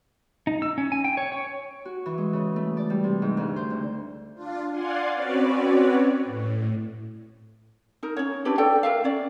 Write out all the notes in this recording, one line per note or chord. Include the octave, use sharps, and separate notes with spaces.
D#4
E6
C#4
G#5
G5
C#5
C#5
F#4
E3
G#3
C#3
A3
D5
G3
C3
G#2
D2
C5
D3
D4 F4
D5 F5 F#5 G#5 C6
C4 C#4 F#4 B4 C#5 D5
A2
D#4 A#4
C#4 C#5
D4 E4 G4 B4
A4 D5 G5
A#4 E5 F5
C#4 D5